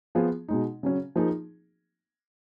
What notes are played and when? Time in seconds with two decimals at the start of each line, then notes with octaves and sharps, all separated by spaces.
0.15 F3 B3 F4 G#4
0.48 B2 G#3 D#4
0.83 C#3 F#3 C#4
1.16 F3 A#3 D#4 G#4